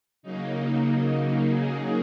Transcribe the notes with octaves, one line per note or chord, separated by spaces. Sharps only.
C#3 F#3 A#3 D#4
D#4
D#4
G#4